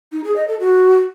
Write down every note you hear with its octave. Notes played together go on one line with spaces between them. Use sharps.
D#4
G#4
D#5
A4
F#4